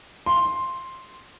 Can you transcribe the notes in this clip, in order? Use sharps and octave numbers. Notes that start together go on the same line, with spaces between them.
C6